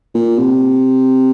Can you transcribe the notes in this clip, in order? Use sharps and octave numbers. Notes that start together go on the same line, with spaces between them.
A#2
C3